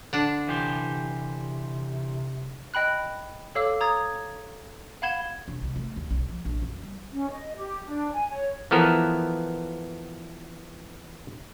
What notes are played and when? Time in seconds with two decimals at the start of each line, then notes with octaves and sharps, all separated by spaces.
0.13 D3 D4
0.48 C3 E3 G4 C5
2.74 D#5 G5 B5 F#6
3.55 A4 C#5 F5 D6 E6
3.81 A#5 D#6 G#6 A6
5.02 F5 F#5 B5 G#6 E7 G7
5.48 E1
5.62 C2
5.76 A3
5.96 D#2
6.11 B1
6.29 F3
6.45 A#1
6.62 F#2
6.82 G3
7.12 C#4
7.31 D#5
7.56 G4
7.86 D4
8.13 G#5
8.31 C#5
8.71 E3 F3 B3 A4 A#4